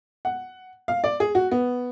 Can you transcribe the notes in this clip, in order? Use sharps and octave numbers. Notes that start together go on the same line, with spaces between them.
F#5
F5
D5
G#4
F#4
B3